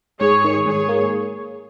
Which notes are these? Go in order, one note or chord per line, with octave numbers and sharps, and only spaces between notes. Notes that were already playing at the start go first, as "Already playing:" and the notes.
G#2 G#4 C#5
D#3
G#2 G#4 C#5
A#3